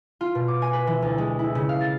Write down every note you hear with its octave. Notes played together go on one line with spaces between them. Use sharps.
F4
B2
D6
G#5
B4
E3
D2
G#3
E4
C#3
F5
A6